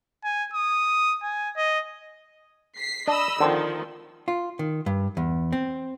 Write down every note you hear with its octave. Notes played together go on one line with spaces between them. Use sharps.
G#5
D#6
G#5
D#5
B6 C7
D4 D#5 B5 E6
D3 D#3 F3 C4
F4
D#3
G2
E2
C4